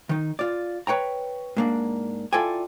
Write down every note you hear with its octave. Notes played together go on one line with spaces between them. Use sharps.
D#3 D#4
F4 D5
B4 C#5 G5 A#5
G#2 A#3 D4
E4 F4 A4 D5 G5 G#5